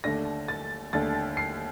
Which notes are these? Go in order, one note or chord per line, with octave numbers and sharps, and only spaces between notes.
D#2 D3 A3 D4 A#6
A6
D#2 D3 A3 D4 A6
C7